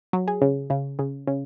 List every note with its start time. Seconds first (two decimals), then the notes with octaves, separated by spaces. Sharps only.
0.13 F#3
0.28 G#4
0.42 C#3
0.70 C#3
0.99 C#3
1.27 C#3